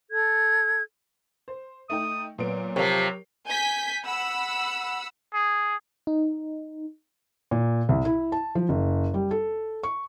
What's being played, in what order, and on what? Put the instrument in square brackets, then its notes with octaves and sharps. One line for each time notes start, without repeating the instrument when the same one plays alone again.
[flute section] A4 G#6
[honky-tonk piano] C5
[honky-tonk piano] A3 D#4 G5 [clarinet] D#6
[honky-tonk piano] A#2 B3 D7 [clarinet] F#3
[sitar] C3 F3 [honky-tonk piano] G4 A#4 C#5
[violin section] G#5 G6 B6
F#5 B5 E6
[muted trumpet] G#4
[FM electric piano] D#4
[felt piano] A#2
C2
E4
A5
F3
F#1
G3
A4
C#6